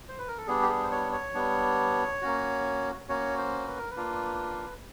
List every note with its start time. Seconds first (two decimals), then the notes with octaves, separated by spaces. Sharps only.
0.09 C5
0.19 B4
0.28 A#4
0.38 A4
0.47 G3 B3 D4 G#4
0.62 G4
0.69 G#4
0.84 C5
0.91 C#5
1.12 C#5
1.34 G3 B3 D4
2.22 A#3 C#4 F#4
3.09 A#3 C#4 F#4 C#5
3.38 C5
3.67 B4
3.78 A#4
3.91 B4
3.96 A#3 D4 F4